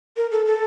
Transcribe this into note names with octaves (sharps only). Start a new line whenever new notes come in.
A#4
A4
A4